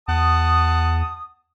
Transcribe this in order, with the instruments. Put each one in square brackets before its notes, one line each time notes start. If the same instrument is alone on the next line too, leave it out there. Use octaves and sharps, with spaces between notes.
[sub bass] E2 [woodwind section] F#5 A5 D#6